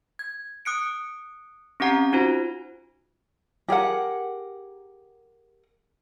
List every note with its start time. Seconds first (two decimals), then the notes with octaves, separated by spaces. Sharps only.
0.19 G#6
0.65 D#6 F#6 C#7 D7
1.80 C4 C#4 G4 F#5 A#5
2.13 D#4 F4 F#4 C5
3.68 G4 G#4 A#4 F#5